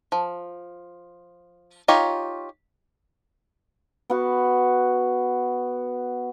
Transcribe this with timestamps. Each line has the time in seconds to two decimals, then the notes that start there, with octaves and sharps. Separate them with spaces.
0.12 F3
1.88 D#4 F4 G4 C#5
4.10 B3 F#4